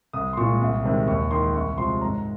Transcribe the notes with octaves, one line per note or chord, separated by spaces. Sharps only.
C2 D#6
C6
A#2 G#3 C#6
C2
C3 D#3 G#3
D#2 C#6
D#3 G#3 C6
C2 C#6
C3 F3 G#3 C6
G#2 A#5